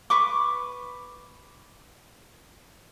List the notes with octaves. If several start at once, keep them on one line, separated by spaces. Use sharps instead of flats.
B4 C#6 D6